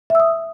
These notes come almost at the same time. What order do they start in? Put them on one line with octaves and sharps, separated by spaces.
E5 E6 D#6